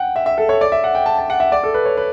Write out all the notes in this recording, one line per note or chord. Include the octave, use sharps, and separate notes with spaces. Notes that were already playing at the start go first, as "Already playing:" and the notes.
Already playing: F#5 G5
E5
E5
A4
C#5
D5
E5
F#5
G5
A5
A5
F#5
E5
D5
A4
B4
C#5
B4